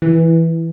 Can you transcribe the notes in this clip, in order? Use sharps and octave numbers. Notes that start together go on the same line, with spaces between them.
E3